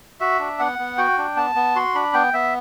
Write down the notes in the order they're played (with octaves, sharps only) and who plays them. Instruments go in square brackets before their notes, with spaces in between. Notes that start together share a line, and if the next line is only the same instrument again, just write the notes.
[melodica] F#4 E5
D4
B3 F#5
B3
F#4 G5
D4
B3 A5
B3
F#4 C6
D4 B5
B3 G5
B3 E5